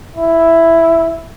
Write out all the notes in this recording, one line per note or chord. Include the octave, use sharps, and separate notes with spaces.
E4